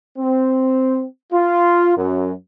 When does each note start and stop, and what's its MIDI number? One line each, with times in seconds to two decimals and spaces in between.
0.17 1.05 60
1.33 1.96 65
1.97 2.32 42